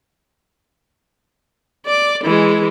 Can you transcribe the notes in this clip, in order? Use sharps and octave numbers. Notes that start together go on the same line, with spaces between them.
D5 D6
E3 G#3